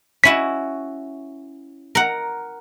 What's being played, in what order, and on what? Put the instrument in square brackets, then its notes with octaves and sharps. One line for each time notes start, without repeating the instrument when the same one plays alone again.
[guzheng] C#4 E4 F#4 [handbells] B6
[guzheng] A#4 F#5